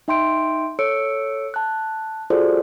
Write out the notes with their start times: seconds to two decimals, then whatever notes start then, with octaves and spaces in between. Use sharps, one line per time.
0.08 D#4 E5 G5 C6 G6 D7
0.79 A4 C#5 E6 C#7 D7
1.54 A5 F#6
2.30 F4 F#4 G#4 A4 C5 D5